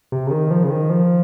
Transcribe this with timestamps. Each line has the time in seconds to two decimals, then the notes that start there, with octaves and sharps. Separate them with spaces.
0.12 C3
0.27 C#3
0.31 D#3
0.51 F3
0.63 C#3
0.70 D#3
0.90 F3